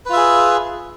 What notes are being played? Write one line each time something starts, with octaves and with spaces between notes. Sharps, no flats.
F4 G#4 B4 E5